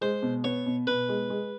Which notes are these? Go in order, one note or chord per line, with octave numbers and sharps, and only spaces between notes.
G#3 C5
B2
B3 C#5
B2
B2 B4
G#3
G#3